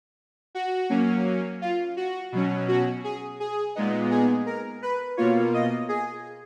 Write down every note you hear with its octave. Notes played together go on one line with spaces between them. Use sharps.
F#4
F#3 A#3 C#4
F4
F#4
B2 F#3 C#4
F#4
G#4
G#4
A#2 G#3 B3 D#4
G#4
A#4
B4
B2 A#3 F4 C#5
D#5
G#4